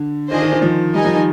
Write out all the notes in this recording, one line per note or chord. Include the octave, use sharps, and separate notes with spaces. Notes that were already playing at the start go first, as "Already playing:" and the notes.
Already playing: D3
D#3 D4 F4 C5 D#5 G#5
D#3
D#3
F3
G3 D#4 A#4 D#5 G#5
F3
D#3